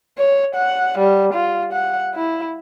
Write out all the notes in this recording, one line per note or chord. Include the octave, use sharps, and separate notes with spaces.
C#5
F#5
G3
F4
F#5
E4